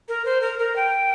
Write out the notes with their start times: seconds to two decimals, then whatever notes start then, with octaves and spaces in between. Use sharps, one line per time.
0.09 A#4
0.25 C5
0.42 A#4
0.59 A#4
0.76 G5